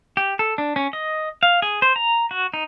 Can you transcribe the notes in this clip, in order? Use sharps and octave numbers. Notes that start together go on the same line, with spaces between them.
G4
A4
D4
C#4
D#5
F5
G#4
C5
A#5
F#4
D#4